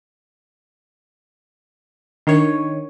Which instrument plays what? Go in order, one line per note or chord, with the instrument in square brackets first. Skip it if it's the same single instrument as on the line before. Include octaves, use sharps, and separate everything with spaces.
[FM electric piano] D#3 C#5 [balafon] D4 A#4